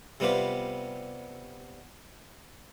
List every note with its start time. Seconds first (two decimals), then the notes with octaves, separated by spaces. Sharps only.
0.20 C3 G3 B3 F4 G4